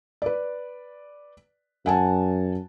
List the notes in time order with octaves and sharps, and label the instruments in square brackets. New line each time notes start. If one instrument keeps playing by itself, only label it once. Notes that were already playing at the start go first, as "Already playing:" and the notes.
[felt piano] B4 D5
[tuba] F#2 [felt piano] F#5 G#5 A5